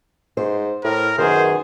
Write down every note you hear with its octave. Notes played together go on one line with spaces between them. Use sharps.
G#2 C5
A2 A#4
F#2 D#3 B3 G#4 C5